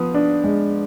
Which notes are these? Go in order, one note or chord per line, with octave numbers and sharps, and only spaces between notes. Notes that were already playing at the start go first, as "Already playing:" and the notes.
Already playing: F3 B3 D#6
D4
G#3